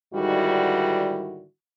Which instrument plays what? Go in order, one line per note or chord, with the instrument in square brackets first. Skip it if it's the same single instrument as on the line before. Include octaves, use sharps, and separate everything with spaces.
[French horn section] G#2 D3 D#3 G3 E4 F#4